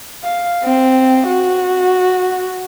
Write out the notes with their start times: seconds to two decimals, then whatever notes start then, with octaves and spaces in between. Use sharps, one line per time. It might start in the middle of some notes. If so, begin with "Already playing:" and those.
0.24 F5
0.64 C4
1.27 F#4